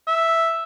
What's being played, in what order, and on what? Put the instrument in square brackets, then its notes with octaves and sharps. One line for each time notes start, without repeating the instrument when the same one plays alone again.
[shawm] E5